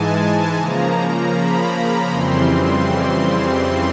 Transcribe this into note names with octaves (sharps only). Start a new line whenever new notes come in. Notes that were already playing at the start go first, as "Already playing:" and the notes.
Already playing: G#2 E3 G#3 G#5 A5
C#3 F3 A#3 A#5
B5
F2 C#3 E3 G3 C4 C6
C6